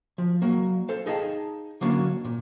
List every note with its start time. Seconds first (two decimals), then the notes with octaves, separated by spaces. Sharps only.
0.18 F3
0.42 F#3 A#3
0.89 A4 C5 F5
1.06 D#4 G#4 D#5 F5 G5 A5
1.81 D3 E3 F#3 A#3 C#4 D4
2.24 A#2